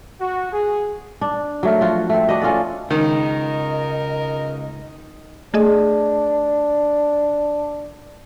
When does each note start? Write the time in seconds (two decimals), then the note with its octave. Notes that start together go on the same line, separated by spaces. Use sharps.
0.19 F#4
0.52 G#4
1.21 D4
1.63 F#3 A3 A#4
1.81 F3 F4 F#4
2.09 A3 C4
2.29 D4 F#4 B4 D#5
2.41 C#4 F4 A4 D5
2.91 C#2 D#3 A#4 D#5
5.54 A3 D4 G#4 D#5